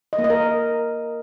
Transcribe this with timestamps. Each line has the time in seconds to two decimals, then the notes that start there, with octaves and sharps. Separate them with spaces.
0.13 D#5
0.18 A#3
0.24 D#5
0.30 A#4